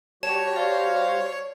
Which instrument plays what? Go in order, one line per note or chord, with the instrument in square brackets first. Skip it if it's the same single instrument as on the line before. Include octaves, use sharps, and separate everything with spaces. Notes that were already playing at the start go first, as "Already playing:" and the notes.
[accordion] G3 F#4 G4 [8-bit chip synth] C#5 [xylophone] A5
[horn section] C5 F5 [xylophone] D5